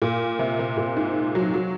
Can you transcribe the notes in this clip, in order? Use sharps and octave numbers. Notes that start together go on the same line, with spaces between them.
A#2
C3
C3
A#2
G#2
F#3
F#3